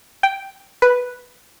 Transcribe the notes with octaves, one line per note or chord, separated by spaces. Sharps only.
G5
B4